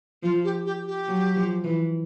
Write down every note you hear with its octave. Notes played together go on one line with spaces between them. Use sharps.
F3 F4
G4
G4
G4
F#3
F3
E3